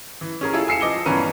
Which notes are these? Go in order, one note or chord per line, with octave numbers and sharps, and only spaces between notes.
E3
C#4 G#4 A#4
E4 F4 G#4 A4
G#5 E6 C7 C#7 E7
F3 D#5 D6 C#7 G7
G2 B2 E3 C#4 A#4 D#7